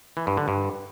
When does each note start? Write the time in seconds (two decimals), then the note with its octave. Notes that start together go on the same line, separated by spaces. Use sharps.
0.17 E3
0.27 G2
0.37 D3
0.48 G2